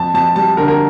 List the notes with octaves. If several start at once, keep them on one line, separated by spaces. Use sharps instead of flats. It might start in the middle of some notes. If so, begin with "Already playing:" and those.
Already playing: F2 A5
F2 A5
G3 A5
D3 A#4
A#4